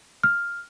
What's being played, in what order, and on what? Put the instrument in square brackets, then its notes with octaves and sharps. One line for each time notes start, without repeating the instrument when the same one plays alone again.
[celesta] F6